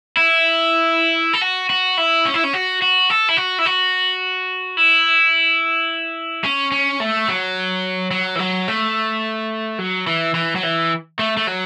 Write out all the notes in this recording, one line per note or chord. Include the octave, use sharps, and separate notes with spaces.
E4
A4
F#4
F#4
E4
C#4
E4
C#4
F#4
F#4
A4
E4
F#4
E4
F#4
E4
C#4
C#4
A3
F#3
F#3
E3
F#3
A3
F#3
E3
E3
F#3
E3
A3
A3
F#3